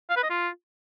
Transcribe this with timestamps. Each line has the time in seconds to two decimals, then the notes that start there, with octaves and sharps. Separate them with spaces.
0.10 F5
0.17 B4
0.23 D#5
0.30 F4